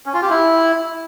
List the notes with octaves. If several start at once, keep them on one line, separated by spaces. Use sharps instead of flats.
C#4
F4
G4
E4